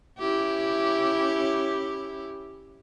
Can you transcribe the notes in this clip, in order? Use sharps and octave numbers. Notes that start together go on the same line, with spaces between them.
C#4 E4 G4